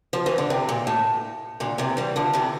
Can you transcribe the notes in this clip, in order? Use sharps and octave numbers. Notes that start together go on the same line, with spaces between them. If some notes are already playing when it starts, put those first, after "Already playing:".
F3
E3
D3
C3
A#2
A2
A#2 D3
C3 E3
E3 G3
D3 F3
C3 E3